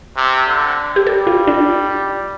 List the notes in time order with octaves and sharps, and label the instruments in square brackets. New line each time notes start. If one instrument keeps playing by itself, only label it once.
[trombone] C3
D3
[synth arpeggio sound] G4
[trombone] G3 [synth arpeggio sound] A4
[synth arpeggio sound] F4
D4